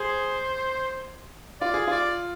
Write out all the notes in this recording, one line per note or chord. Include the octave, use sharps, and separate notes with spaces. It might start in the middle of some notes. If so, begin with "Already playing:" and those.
Already playing: G#4 C5
F4 D5
G#4
F4 D5